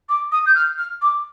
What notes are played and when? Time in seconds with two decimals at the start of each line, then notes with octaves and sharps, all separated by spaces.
0.09 D6
0.32 D#6
0.46 G6
0.55 F6
0.78 F6
1.02 D6